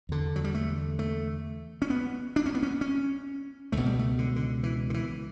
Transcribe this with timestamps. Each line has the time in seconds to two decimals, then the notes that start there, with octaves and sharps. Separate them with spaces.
0.09 E2 D3
0.36 F#3
0.44 G3
0.55 A3
0.99 A3
1.82 C#4
1.90 B3
2.36 D4
2.46 C#4
2.55 B3
2.63 C#4
2.81 C#4
3.72 C#2 B2 A3
3.86 G3
3.99 A3
4.19 D3
4.36 D3
4.63 E3
4.90 D3
4.94 E3